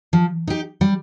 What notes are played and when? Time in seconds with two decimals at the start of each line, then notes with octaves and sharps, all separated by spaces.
0.13 F3
0.47 D#4 G4
0.81 G3